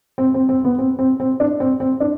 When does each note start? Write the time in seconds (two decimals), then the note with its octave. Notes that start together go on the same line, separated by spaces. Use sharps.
0.18 C4
0.34 C4
0.49 C4
0.64 B3
0.79 C4
0.99 C4
1.20 C4
1.40 D4
1.60 C4
1.80 C4
2.00 D4